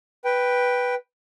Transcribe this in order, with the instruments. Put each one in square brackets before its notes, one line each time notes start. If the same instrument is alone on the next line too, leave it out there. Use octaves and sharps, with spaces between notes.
[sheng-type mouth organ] B4 G5